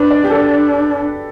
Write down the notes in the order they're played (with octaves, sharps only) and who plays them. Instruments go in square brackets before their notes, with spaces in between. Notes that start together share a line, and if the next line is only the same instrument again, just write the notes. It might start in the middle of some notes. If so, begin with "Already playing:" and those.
Already playing: [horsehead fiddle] D4 [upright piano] B4
[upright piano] D5
G4
[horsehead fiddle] D4 [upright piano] A4